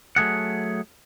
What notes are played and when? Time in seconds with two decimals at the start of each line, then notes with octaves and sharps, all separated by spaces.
0.16 F#3 A3 G#4 F#5